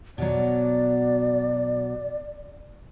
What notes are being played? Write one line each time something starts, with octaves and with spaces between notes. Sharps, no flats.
B2 F#3 D5